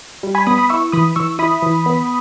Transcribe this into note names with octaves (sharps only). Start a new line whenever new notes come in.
G3
G#5 B5
B3 B5 D#6
B5 D#6
E4 C#6 E6
E3 B5 D#6
E3 C#6 E6
E4 B5 D#6
E3
B3